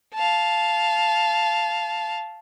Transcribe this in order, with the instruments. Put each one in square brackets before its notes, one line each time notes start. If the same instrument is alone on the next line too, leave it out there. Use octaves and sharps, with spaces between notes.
[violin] F5 A5